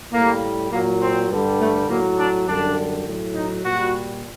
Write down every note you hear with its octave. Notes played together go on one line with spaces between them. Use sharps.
A2 G3 A#3
A#2 F#3 A#3
C4
G2 D3 G3
A3
A2 F#3 A#3
D4
F#2 D3 G3 D4
A2 F#3
D#4
A#2 G3 F#4